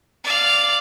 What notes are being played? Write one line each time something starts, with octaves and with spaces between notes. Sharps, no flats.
D5 F5